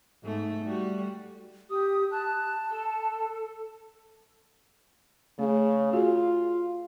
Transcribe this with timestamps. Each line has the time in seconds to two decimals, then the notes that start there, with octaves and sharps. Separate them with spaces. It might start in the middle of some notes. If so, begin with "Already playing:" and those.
0.23 G#2 A3
0.64 G3 F#4
1.70 G4 D#6
2.11 A5 F#6
2.70 A4
5.39 C#3 A3 G#4
5.93 F4 F#4 G#4